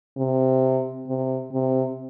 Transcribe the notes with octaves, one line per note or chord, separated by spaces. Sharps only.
C3
C3
C3